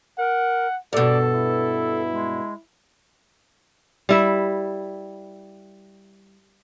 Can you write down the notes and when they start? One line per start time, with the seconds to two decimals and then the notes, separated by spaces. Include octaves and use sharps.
0.18 A#4 F#5
0.93 G2 B2 A4 D5
1.34 E4
2.12 G#3
4.09 G3 E4 E5